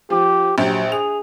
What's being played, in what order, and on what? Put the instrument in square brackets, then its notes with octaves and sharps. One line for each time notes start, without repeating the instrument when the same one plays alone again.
[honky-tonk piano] F3 [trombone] G4
[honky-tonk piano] A#1 G4 [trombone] F#3
[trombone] G#4 [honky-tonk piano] F7